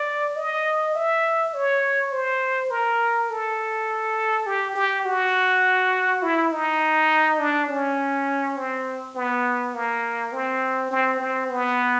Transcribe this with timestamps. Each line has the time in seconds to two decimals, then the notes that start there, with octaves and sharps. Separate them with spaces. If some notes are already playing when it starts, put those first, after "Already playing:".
Already playing: D5
0.37 D#5
0.95 E5
1.54 C#5
2.12 C5
2.71 A#4
3.30 A4
4.46 G4
4.76 G4
5.05 F#4
6.23 E4
6.52 D#4
7.40 D4
7.69 C#4
8.57 C4
9.16 B3
9.74 A#3
10.33 C4
10.91 C4
11.20 C4
11.50 B3